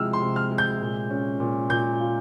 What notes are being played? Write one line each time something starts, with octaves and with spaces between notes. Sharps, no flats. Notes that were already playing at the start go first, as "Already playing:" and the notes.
Already playing: C3 F3 G#3 E4 E6 F6
C6
C3
F6
G#3
G6
A#2
C#4
A#2
A#2 G6
F4